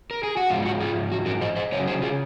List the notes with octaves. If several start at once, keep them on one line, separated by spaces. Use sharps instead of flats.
A#4
G#4
F#4
G#2 F3 G#3 F4
F#4
F4 G#4
F#4
F#4 A#4
C5 D#5
C5 D#5
C#3 F#3 C#4 A#4 C#5
G#4 C5
F4 G#4